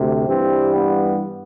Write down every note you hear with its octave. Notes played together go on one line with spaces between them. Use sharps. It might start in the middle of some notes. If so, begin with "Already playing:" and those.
Already playing: D2 C3
G2 E3 G3 C4
B3